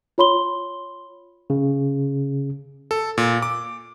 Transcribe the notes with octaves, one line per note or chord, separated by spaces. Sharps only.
F4 C#5 B5 C6 G7
C#3
A4
A#2
D6